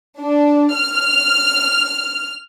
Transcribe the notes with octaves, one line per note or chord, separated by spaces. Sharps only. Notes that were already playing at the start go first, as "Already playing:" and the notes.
D4
F6